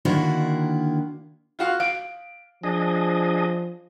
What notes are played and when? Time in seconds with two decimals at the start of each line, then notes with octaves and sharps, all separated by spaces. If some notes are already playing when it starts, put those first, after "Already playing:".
0.05 D3 D#3 A#3 D4 E4 F#4
1.59 F4 F#4 F5
1.80 F5 D7
2.63 F3 D4 G#4 D#5